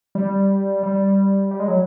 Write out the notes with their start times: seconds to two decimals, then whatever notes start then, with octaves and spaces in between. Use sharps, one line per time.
0.15 G3
0.83 G3
1.51 G3
1.60 G#3
1.68 F#3